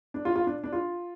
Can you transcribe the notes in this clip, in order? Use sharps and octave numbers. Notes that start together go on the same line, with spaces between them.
D4
F4
F4
D4
D4
F4